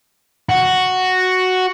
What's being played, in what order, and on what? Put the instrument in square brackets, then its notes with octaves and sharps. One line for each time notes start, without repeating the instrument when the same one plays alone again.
[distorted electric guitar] F#4